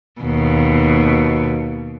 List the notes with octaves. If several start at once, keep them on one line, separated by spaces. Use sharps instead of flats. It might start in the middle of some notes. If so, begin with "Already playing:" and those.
D#2 B2